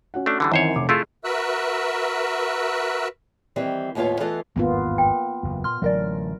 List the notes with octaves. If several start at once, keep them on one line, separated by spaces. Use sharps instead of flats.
C#4 F#4 F#5
A3 D4
D3 E3 G3
F#2 D#3 E3 C4 C5 C#5
F1 D6
A3 E4 F4 G#4 C6 E6
F#4 A#4 B4 E5 E6 F#6
D#3 E3 G3 C4
D#2 A2 B3 F4 C#5 F5
E3 A3 B3 F4 A4 D#5
G#1 E2 G2 A#3 B3 F4
G5
F#1 E2
A#2 C6 F6
A1 D3 F#3 A#4 D5